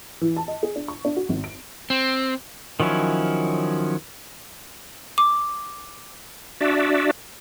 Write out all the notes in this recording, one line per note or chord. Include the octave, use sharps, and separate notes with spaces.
E3
A5
D#5
G#4
D4
C#6
D4
F#4
G#1
D7
C4
D#3 F3 F#3 C#4 E4
D6
D4 F#4 D5 E5